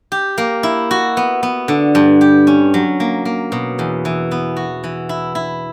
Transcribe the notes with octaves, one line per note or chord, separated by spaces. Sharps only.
G4
A#3
E4
F#4
B3
B3
D3
G2
G4
C#4
F#3
A#3
A#3
B2
E2
E3
B3
F#4
E3
E4
E4